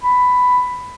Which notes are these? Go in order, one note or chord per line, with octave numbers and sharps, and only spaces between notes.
B5